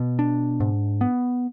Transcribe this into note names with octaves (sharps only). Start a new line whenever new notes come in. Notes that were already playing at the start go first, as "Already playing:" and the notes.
Already playing: B2
D4
G#2
B3